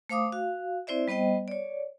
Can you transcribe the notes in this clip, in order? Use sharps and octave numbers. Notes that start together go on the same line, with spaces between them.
A3 C5 F5 D6 D#6
F#4 F5
C4 E4 C5 D5 E5
G3 B3 C5 D#5 G5
C#5 D5